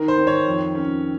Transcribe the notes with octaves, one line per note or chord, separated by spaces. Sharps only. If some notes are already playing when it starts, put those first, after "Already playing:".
Already playing: D#3 D#4 A#4
C5
D#3
C#5
F2
C#4